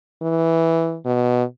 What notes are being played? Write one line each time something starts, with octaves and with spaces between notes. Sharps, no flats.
E3
B2